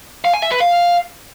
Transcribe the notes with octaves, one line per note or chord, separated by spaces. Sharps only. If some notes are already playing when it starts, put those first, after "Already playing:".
F5
G#5
E5
B4
F5